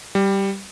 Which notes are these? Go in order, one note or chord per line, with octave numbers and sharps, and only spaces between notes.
G3